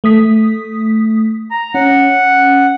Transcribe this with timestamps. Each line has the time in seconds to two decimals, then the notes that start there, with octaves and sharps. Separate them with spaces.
0.04 A3 D#6 B6
1.51 A#5
1.74 C#4 F#5